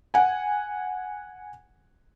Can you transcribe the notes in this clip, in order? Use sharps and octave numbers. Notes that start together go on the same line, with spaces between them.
F#5 G#5